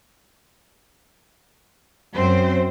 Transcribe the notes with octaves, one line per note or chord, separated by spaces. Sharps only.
F#2 C4 C5